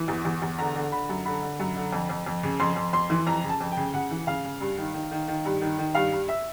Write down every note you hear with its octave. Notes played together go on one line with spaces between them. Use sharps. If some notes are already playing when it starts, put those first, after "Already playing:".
Already playing: E3
E2
E2
E2
D3 A#5
D3
D3 B5
F#2
D3 B5
D3
F#2
D3
F2
F2
F2
C#3
F2 C6
F2
F2 C6
E3
F2 A#5
C#3
A5
F2
G5
C#3
C#3 F#5
E3
C#3 F5
C#3
G2
D#3
D#3
D#3
D#3
G2
D#3
D#3
G2 F5
G2
E5